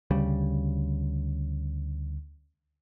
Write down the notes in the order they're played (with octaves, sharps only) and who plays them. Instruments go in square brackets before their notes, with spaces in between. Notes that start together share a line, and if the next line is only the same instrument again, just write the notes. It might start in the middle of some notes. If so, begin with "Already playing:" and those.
[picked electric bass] D2 C#3 G3